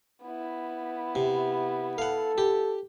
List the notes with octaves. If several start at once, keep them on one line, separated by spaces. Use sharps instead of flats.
B3 E4
C3
A4 F5 F#5
G4